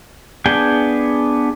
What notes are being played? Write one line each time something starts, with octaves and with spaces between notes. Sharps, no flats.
B3 D4 G#4 G5 G#5